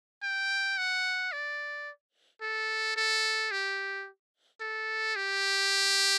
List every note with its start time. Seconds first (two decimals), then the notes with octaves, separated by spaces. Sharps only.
0.23 G5
0.77 F#5
1.32 D5
2.42 A4
2.96 A4
3.51 G4
4.61 A4
5.16 G4